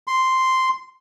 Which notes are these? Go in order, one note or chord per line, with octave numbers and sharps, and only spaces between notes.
C6